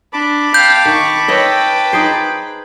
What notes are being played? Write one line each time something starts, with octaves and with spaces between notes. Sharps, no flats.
D4 A5 B5 D6
F5 G5 G6
D#3 C#6
B4 C#5 D#5 E5 G5
D#4 G#4 C5